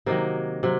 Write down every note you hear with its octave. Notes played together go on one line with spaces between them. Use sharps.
C3 D#3 F#3 A#3
C3 F#3